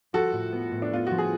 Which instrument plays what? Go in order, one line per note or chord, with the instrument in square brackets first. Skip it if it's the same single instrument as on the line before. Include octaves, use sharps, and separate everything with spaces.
[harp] F3 [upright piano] F#4 A4
[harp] A2
B3
A2
[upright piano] D4
[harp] B3 [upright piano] F4
[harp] F3 [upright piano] F#4
[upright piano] G#4